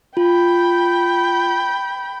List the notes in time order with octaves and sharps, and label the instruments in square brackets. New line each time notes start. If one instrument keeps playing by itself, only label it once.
[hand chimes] F4 [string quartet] G5 B5